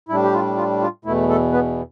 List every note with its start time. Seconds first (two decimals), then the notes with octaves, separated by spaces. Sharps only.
0.09 A2 G3 D4 E4
0.23 G4
0.33 F4
0.57 F4
0.81 F4
1.05 E2 B2 A3 E4
1.29 A3 A4
1.52 B3 B4